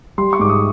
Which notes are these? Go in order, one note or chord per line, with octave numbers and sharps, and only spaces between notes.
G3 C6
C#6
G#2 D6
D#6